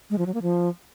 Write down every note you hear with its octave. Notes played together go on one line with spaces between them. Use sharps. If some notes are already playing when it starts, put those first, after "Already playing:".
G#3
F3
F#3
A#3
F3